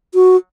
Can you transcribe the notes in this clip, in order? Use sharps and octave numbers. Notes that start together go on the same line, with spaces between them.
F#4